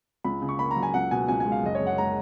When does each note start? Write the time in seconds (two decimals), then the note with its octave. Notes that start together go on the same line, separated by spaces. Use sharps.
0.24 C#2 B5
0.42 C#3
0.49 C#6
0.59 A#3 B5
0.71 A#5
0.76 F#3
0.83 G#5
0.94 C#2 F#5
1.11 B2 G#5
1.28 C#2 G#5
1.40 G#5
1.46 G#3
1.52 F5
1.63 F#1 D#5
1.75 C#5
1.80 F#2
1.87 F#5
1.98 G#3 A#5